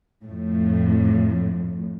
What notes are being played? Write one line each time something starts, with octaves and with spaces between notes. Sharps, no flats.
F2 A2